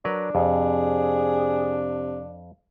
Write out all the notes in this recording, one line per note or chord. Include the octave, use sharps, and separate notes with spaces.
F#3 D4 A#4 B4
F2 C3 G#4